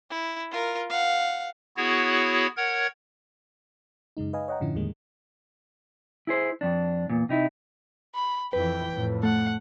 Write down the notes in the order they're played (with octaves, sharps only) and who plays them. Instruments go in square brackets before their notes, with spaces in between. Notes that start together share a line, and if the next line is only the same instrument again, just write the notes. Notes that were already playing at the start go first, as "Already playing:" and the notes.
[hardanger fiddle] E4
F4 A#4
F5 F#5
[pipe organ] B3 E4 F#4 G#4 C#5
A#4 C#5 F#5 G#6
[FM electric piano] F#2 C#3 G#3 D#4
B4 D#5 F5 G#5
C#5 D#5 F#5 G5 A#5
F#2 A2 D3 F3 C#4 E4
E2 A2 D#3 G3 G#3 A#3
[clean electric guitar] E4 G#4 C5
F2 D4
E2 A#2
C3 D#4 E4
[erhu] B5
[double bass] F2 E3 [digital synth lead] B4 [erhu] G5
[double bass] F2 A2
[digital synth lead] A3 [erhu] F#5